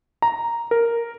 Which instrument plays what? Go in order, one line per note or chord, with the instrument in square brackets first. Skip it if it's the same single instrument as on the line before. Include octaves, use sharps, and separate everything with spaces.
[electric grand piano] A#5
A#4